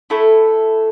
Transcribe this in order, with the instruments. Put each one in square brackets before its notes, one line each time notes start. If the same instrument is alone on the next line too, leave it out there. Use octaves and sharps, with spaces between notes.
[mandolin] A3 E4 A4